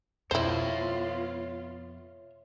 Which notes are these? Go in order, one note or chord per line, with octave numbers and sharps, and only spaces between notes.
F2 B2 B3 E4 F4 C5 C#5 E5